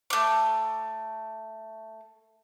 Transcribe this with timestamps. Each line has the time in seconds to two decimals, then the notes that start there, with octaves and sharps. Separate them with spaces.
0.10 A3 D6